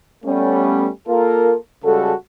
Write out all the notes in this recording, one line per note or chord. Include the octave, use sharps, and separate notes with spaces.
G3 A3 B3 C#4
A#3 F4 A4 A#4
C#3 G3 G#3 F#4 A4